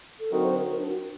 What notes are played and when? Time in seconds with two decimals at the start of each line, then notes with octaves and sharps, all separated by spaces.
0.20 A4
0.31 D3 F#3 C4 D#4 F#4 A#4
0.44 C5
0.56 A#4
0.69 A#4
0.78 D4
0.88 F#4